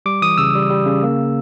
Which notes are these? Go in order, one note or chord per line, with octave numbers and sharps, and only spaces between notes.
G3 D6
E3 D#6
C#3 E6
G3
G3
C#3
A#3